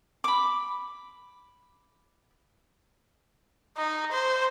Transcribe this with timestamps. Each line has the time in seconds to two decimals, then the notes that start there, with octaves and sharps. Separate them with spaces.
0.24 B5 D6
3.77 D#4
4.12 C5